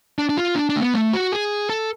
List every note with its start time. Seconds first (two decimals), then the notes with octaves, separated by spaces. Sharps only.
0.18 D4
0.29 D4
0.37 F4
0.56 D4
0.69 D4
0.76 A3
0.82 B3
0.94 A3
1.13 F#4
1.32 G#4
1.70 A4